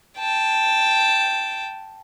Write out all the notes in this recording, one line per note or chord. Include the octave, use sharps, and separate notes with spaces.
G5 A5